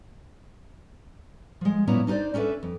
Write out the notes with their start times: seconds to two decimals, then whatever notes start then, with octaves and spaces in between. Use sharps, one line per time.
1.61 F3 G#3
1.87 F#2 A#2 B3 C#4 E4 A#5
2.07 D4 D#4 B4 C5 D5
2.34 C#4 D4 A4 B4 E5
2.63 F2